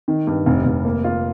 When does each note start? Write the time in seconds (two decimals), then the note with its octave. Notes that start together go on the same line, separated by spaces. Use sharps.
0.08 D#3
0.27 G2
0.46 F1
0.66 F1
0.85 A#3
1.04 F4